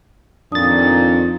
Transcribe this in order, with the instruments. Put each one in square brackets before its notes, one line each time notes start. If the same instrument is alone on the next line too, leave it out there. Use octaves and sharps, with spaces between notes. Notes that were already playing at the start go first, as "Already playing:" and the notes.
[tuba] F2 [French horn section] A#2 D#3 [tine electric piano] D4 A6 [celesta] D#6